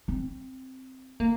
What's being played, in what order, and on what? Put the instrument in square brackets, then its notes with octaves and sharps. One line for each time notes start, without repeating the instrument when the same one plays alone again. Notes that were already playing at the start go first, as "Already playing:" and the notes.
[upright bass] C4
A#3